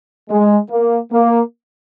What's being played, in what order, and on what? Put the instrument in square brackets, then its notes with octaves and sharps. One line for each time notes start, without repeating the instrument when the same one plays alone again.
[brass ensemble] G#3
A#3
A#3